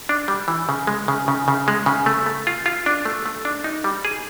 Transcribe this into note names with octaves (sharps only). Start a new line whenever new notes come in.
D4
G3
E3
C#3
G#3
C#3
C#3
C#3
G#3
C#3
A3
A3
F4
F4
D4
A3
A3
D4
D#4
G3
G#4